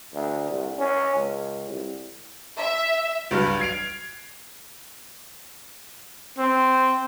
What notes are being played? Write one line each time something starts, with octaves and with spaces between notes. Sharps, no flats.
D2
C2
C#4
C#2
C2
E5
C#2 G2 F#3 F6
G#6 C7 D7 F7
C4